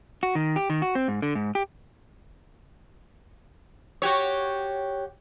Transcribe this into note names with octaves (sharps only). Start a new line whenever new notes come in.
F#4
D#3
G4
D#3
F#4
C4
G#2
D3
G#2
G4
F#4 G4 C#5